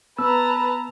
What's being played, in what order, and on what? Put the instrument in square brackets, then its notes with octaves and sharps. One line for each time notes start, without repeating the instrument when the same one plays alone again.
[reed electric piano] B3 E6 [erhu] B4 [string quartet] A5 A#5